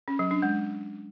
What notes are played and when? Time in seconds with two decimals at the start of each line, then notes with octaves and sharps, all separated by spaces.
0.08 C#4
0.19 F#3
0.31 D4
0.42 G#3